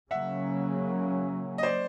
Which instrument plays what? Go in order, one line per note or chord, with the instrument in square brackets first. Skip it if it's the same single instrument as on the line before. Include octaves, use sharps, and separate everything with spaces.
[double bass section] C#3 F#3 A#3 C#4 [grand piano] E5 F#5
[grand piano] D#5
C5 D5